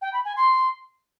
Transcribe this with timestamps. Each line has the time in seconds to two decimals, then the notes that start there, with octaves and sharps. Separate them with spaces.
0.01 G5
0.13 B5
0.24 G#5
0.36 C6